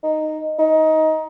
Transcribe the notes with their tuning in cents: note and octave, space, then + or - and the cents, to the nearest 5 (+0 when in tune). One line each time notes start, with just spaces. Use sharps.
D#4 -5
D#4 +20